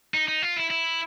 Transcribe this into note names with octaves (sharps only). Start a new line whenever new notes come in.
D#4
D#4
F4
E4
E4